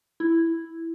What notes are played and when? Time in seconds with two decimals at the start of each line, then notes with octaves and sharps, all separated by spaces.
0.20 E4